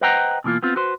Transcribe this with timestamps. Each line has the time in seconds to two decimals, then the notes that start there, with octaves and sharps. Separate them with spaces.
0.01 B4 C5 D#5 F#5 G5 A#5
0.44 B2 E3 A#3 F4
0.63 B3 C4 F4
0.76 F#4 B4 C5